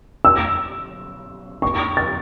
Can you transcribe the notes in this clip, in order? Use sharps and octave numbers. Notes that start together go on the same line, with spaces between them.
E6
C#6
A6